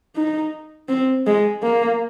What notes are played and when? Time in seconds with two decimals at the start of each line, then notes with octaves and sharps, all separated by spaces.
0.15 D#4
0.89 C4
1.27 G#3
1.63 A#3